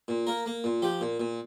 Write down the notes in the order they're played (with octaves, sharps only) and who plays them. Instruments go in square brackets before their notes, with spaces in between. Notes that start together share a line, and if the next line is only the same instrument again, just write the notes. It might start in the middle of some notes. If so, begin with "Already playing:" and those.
[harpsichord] A#2
A#3 A#4
A#3
A#2
F3 G4
A#2
A#2